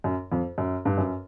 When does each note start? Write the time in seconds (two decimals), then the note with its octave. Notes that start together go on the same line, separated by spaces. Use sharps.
0.04 F#2
0.32 F2
0.58 F#2
0.85 G2
0.98 F#2